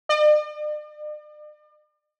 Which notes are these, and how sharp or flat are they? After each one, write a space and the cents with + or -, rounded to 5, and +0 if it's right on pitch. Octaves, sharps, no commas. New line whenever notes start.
D5 +45